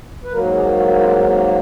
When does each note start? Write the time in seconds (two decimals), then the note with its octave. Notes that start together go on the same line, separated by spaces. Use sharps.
0.24 B4
0.32 G#2 F#3 A#3 A#4
0.55 G#4
0.77 F#4
0.99 F4
1.20 D#4
1.36 C#4